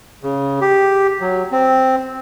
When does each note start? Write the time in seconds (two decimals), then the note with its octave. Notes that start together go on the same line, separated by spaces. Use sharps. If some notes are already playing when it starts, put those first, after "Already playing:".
0.23 C#3
0.61 G4
1.21 F#3
1.52 C4